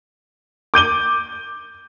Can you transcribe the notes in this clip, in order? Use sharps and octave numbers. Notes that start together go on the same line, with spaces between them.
D6 G6 D#7 G7